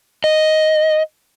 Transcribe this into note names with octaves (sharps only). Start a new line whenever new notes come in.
D#5